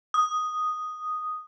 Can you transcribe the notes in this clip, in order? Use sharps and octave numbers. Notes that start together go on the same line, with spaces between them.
D#6